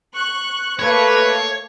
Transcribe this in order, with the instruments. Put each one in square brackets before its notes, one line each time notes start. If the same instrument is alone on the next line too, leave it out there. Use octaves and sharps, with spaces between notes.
[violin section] C#6 F#6
[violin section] A3 A#3 [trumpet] B4 [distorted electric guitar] C#5